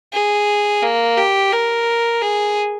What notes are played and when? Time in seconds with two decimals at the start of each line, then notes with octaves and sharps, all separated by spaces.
0.13 G#4
0.82 A#3
1.18 G4
1.52 A#4
2.22 G#4